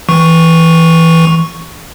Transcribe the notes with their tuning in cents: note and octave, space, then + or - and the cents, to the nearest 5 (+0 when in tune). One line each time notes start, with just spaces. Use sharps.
E3 +0 C#6 +0